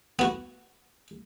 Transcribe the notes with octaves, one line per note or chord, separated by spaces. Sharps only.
B3 F#4